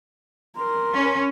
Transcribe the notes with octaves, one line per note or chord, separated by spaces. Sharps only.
A#4 C6
C#4